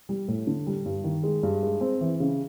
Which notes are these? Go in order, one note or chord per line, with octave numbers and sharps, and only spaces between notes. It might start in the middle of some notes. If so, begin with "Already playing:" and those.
G3
A2
D3
G3
G2
D#3
G#3
G2
G#3
C4
E3
C#3